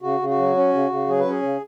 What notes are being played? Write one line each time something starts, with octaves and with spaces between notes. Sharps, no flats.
C#3 F#4
C#3
F#4
F#3
C#4
C#3
C#3
F#3 G#4
B4
C#4
G#4
C#3